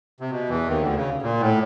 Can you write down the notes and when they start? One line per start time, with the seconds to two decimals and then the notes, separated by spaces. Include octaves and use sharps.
0.20 C3
0.30 B2
0.49 E2 E3
0.68 D#2 D#3
0.81 D2 D3
0.95 C#3
1.22 A#2
1.40 A2